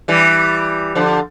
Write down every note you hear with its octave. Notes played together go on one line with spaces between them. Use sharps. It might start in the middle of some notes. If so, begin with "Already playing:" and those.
E3 G3
D3 F3